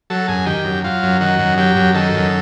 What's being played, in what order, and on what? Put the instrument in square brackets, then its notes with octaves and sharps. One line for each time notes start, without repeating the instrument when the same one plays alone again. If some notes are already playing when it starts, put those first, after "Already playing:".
[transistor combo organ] F#3 A4
F#2 G#4
D#3 G4
F#2
F#3 F4
F#2
D#3 F#4
F#2
F#3 G4
F#2
D#3 A4
F#2